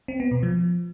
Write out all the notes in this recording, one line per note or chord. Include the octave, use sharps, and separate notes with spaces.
C4
B3
B2
F3